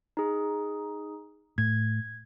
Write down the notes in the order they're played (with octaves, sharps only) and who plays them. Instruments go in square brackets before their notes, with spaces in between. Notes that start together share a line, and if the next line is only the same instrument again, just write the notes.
[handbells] D#4 G#4
[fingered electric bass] A2 [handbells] G#6